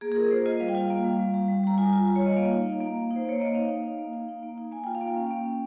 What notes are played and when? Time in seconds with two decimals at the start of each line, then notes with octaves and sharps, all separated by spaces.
0.01 A#3 G#4
0.12 G#4
0.16 F4 A#4
0.31 A#3 C5
0.46 F4 D#5
0.60 G3 F5
0.68 G5
0.75 F4 F5
0.90 A#3
1.05 G3
1.19 G3
1.34 G3
1.48 G3
1.64 G3 A#5
1.78 F4 G#5
1.93 F4
2.07 G3
2.16 C#5
2.22 F4 D#5
2.36 A#3 F5
2.52 D#4
2.66 D#4
2.81 A#3
2.96 A#3
3.11 D#4
3.16 C5
3.25 A#3 C#5
3.40 A#3 D#5
3.54 D#4 F5
3.69 D#4
3.84 D#4
3.99 A#3
4.13 D#4
4.28 D#4
4.43 A#3
4.58 D#4
4.71 A#3 G#5
4.84 F4 G5
4.95 F5
5.01 A#3
5.07 G5
5.16 C#4
5.31 A#3
5.45 C#4